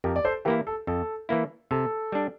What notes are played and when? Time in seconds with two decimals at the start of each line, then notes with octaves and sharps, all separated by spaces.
0.04 F2 G4 A#4
0.16 D5
0.25 A4 C5
0.45 E3 A#3 E4 G4 A#4
0.67 A4
0.87 F2 A4
1.29 E3 A#3 E4
1.71 C3 A4
2.12 G3 D4